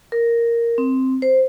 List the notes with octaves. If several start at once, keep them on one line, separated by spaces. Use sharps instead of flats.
A#4
C4
C5